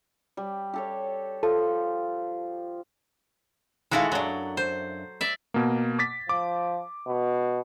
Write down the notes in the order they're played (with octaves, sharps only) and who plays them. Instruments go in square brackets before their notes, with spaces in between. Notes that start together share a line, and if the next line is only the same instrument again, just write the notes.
[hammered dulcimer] G3
G4 A4 C#5
[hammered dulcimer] F3 [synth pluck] A4
[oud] D#3 E4 F5 [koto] G#3 F#4 A4
[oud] F#2 D4 [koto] F#3
[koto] C5
D5 E5
[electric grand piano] B2 A#3
D6 A6 B6
[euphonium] F3 [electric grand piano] D6
[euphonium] B2